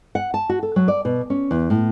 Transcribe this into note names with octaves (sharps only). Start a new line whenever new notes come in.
F#5
A5
F#4
A4
F#3
D5
B2
C#4
E2
A2